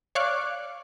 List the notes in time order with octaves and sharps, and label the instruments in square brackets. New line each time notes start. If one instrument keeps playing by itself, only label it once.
[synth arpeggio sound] C#5 D5 F5 C#6 D6 F#6